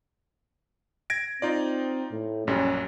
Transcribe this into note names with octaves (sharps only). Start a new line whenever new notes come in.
G#6 A#6 D7
C4 D#4 F4 D5
A2
A#1 F#2 G3 C#4